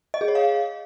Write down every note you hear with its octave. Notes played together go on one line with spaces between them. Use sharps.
D#5
G#4
C#5
F5